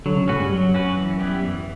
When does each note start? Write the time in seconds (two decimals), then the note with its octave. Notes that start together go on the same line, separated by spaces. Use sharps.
0.05 D3 F#3
0.17 C#3
0.28 A2 C#4 F#4 B4
0.40 G2
0.51 F#2 F#3
0.74 C#4 F#4 B4
0.97 E3
1.19 G3 B3 E4 G4
1.43 E3